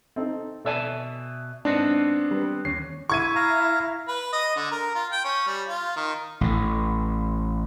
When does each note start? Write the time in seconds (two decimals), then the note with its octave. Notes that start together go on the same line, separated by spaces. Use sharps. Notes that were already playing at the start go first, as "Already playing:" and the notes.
0.16 C4 D#4 A4
0.65 B2 A4 D5 E5 G#5 A5
1.65 G#2 B3 C4 D4
2.31 G3 B4
2.65 D#2 C#4 C7
3.10 E4 C#6 G#6 D#7
3.36 F5 A#5
4.08 B4
4.33 D#5
4.56 D3
4.71 A#4
4.95 F4
5.12 G5
5.24 C#4
5.47 G3
5.68 F4
5.96 D#3
6.41 A1 A2